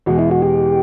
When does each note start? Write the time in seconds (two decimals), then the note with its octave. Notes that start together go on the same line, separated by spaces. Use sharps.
0.06 E2 B2 G#3 F#4
0.19 E4
0.31 F#4
0.42 G4